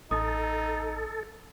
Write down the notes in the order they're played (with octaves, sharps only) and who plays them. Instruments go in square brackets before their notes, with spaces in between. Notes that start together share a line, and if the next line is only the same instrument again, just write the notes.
[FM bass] A1 [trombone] D#4 [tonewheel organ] A4 [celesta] D#6